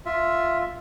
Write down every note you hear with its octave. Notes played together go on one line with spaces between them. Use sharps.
F4 E5